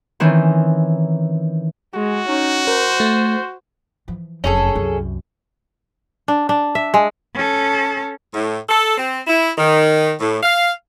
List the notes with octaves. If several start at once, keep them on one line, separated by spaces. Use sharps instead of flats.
D#3 E3 C4 C#4 D#4
G#3 F#4
C#4 D#4
A#4 C5
A3
E3 F3
F1 F#2 C#4 G#4 A4
C2 F#2
D4
D4
E5
G#3
C#4 A4
A2
A4
C4
E4
D#3
A2
F5